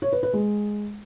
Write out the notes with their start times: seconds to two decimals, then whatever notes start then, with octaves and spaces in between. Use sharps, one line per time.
0.02 C#5
0.12 B4
0.23 B4
0.33 G#3